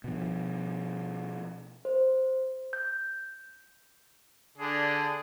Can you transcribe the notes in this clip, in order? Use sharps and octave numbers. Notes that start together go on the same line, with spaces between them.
B2 F3
C5
G6
D3 D4 G#4